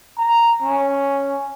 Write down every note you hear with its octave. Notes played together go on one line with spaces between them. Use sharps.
A#5
C#4